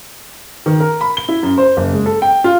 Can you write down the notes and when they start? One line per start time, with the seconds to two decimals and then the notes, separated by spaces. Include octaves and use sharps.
0.66 D#3
0.80 A#4
1.01 B5
1.17 G7
1.29 E4
1.43 F#2
1.58 C5
1.77 F#1
1.93 G#3
2.06 A4
2.22 G5
2.44 F4